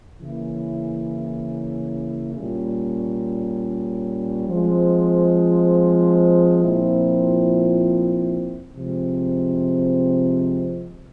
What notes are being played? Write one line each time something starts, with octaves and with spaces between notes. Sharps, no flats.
C#3 E3 A#3 C#4 E4
A#2 G3 C#4
F3 G#3 C4
A#2 F3 C4 E4
C3 F3 G#3 C4